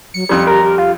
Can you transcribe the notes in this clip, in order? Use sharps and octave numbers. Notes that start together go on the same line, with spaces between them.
F#3 C#7
F2 G3 D#4
G4 A#4
G4
F4